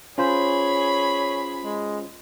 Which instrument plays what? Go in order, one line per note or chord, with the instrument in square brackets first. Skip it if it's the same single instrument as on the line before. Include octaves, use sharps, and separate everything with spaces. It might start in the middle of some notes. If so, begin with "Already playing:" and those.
[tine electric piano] C#4 F4 C5 [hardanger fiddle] G#4 B5 [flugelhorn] C#5
[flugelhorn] G#3